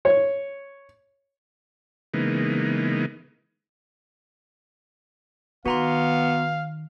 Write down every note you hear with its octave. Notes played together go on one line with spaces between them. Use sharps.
C#5
C#3 E3 G#3 A#3 B3 D#4
D#3 B3 F#4 F5 A#5 C6